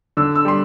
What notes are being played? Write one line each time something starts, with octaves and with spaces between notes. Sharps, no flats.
D3 E6
E6
G3 C6